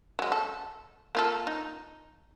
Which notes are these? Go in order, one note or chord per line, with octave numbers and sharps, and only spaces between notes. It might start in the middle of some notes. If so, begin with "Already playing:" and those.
F#3 G#3
A4
A#3 F4 A4
D#4